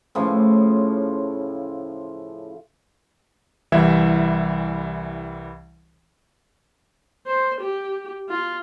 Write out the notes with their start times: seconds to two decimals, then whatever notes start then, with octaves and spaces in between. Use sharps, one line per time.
0.15 A2 C#3 F3
3.72 C2 E3 G3 E5 G#6
7.27 C5
7.61 G4
8.29 F4